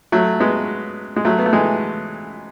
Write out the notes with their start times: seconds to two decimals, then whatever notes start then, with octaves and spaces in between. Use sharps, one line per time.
0.12 F#3 A3
0.40 G#3 B3
1.16 G#3
1.25 F#3 A3
1.39 B3
1.46 A3
1.53 E3 G#3